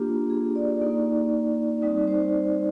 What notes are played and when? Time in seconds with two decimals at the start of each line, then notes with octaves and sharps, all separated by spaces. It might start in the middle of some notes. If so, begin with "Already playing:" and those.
Already playing: A#3 D4 F4 G4
0.30 G#4
0.56 D5
0.81 A#3 D#4
1.82 G3 C4 D#4 D5
2.08 C5